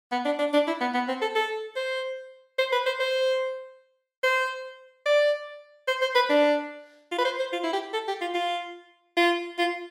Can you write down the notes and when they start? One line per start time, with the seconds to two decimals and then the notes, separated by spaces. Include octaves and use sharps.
0.12 B3
0.25 D4
0.39 D4
0.53 D4
0.67 E4
0.81 B3
0.94 B3
1.08 C4
1.21 A4
1.35 A4
1.76 C5
2.58 C5
2.72 B4
2.86 C5
3.00 C5
4.23 C5
5.06 D5
5.88 C5
6.01 C5
6.15 B4
6.29 D4
7.11 F4
7.18 B4
7.25 C5
7.39 C5
7.53 F4
7.63 E4
7.73 G4
7.93 A4
8.08 G4
8.21 F4
8.34 F4
9.17 F4
9.58 F4